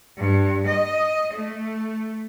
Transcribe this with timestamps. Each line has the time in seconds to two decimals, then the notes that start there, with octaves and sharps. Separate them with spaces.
0.17 G2
0.66 D#5
1.33 A3